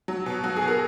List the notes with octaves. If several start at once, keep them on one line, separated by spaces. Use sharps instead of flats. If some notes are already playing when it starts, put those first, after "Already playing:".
F#3
B2
F#3 F#4
G#4
B2
A#4